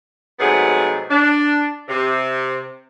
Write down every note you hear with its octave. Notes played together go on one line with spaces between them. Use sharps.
G#2 C3 F#3 A3 B3 G#4
D4
C3